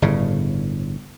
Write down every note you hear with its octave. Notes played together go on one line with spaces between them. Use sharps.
G1 A2 C#3